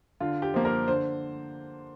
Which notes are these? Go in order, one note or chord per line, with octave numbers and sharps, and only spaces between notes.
D3 F4
G4
F3 A#3
A#4
D3 C5